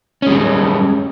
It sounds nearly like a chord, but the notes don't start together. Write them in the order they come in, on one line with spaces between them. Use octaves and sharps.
C#4 G#3 G3